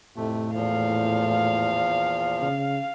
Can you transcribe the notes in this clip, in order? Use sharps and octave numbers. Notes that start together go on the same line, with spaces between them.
F2 A2 C3 A3
E2 A#2 F3 F5
C#3